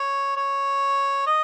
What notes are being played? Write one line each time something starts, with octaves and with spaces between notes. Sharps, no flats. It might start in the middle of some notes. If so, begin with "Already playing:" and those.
Already playing: C#5
C#5
D#5